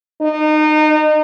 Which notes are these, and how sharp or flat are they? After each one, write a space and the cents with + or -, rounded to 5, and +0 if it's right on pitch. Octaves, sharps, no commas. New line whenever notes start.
D#4 -30